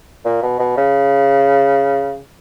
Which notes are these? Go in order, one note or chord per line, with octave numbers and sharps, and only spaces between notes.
A#2
B2
B2
C#3